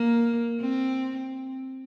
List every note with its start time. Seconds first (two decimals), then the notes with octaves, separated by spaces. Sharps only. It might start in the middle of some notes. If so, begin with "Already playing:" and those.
Already playing: A#3
0.61 C4